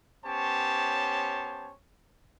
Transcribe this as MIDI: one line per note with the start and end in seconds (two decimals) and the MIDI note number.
0.25 1.72 59
0.25 1.72 61
0.25 1.72 67
0.25 1.72 72
0.25 1.72 73
0.25 1.72 81